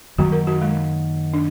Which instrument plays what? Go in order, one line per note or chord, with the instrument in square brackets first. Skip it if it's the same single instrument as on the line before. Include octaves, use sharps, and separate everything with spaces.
[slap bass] F#2 D#3 F#3 A#3 [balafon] F#4
[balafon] A#4
F#4
G#3
D4